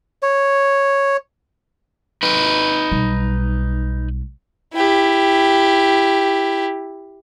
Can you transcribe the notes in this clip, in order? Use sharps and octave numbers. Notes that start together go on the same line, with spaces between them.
C#5
D#4 B4
B1 G3
E4 G4